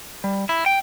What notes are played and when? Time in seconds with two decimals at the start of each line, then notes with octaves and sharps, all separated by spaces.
0.24 G3
0.49 E4
0.66 G5